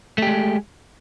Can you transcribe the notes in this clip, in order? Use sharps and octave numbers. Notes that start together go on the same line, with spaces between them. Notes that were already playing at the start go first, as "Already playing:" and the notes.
G#3 A3 G4